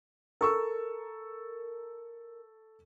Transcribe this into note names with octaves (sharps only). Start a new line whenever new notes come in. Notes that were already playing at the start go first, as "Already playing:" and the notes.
A4 A#4 C#6 E6